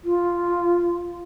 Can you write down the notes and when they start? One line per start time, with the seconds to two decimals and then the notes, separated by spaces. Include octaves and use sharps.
0.05 F4